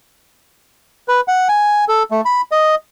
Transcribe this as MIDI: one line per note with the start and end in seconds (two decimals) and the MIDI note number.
1.08 1.21 71
1.28 1.48 78
1.49 1.85 80
1.88 2.03 69
2.11 2.21 57
2.25 2.41 83
2.51 2.75 75